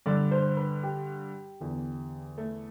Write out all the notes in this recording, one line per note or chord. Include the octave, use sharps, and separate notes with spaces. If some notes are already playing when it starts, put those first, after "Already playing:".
G2 D3 D5
C5
B4
G4
E2 D3
A3